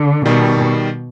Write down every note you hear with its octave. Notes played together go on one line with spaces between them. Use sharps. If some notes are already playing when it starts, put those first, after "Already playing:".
Already playing: D3
B2 D#3 G3